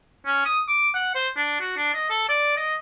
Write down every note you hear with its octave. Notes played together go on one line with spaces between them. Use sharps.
C#4
D#6
D6
F#5
C5
D4
F#4
D4
D#5
A4
D5
D#5